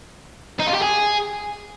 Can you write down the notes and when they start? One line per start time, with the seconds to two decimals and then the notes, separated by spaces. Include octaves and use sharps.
0.59 D#4
0.67 F4
0.74 G4
0.82 G#4